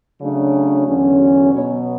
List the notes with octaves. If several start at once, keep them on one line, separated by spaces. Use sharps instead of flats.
C#3 F#3 A3 D4
E2 D3 F#3 C#4
F#4
B2 F#3 B3 C#5